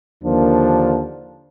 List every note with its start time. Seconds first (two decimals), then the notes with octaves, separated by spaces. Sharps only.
0.23 D#2 D3 F3 A#3 D4